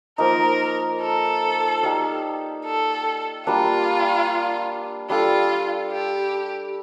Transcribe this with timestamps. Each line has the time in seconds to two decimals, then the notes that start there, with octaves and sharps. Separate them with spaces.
0.18 F3 A#3 D#4 A#4
1.01 A4
1.83 D#4 G4 D5 F5
2.65 A4
3.46 G3 A#3 D4 F4
5.10 G3 D4 F4 A4
5.91 G4